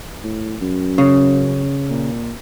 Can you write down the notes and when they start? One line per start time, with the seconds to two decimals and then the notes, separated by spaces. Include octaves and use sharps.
0.24 A2
0.61 F#2
0.98 C#3
1.90 A#2